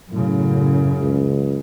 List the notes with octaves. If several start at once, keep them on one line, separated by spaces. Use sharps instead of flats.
F#2 A2 C#3
C#2